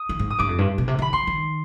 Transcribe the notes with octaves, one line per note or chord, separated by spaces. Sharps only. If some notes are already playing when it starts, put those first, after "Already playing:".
Already playing: D#6
D#3
G#2
D#6
G2 D6
F2
G2
B2
C3
D#3 B5
F3 C6
D#3